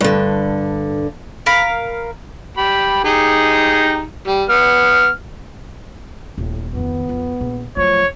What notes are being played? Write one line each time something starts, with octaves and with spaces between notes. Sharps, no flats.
G2 D3
A#4 F5 B5
G4 B5
D#4 G4 G#4
G3
B3 F6
D#1 A2
F2 D#3 B3
F2
A#1
F3 F#3 A3 C#5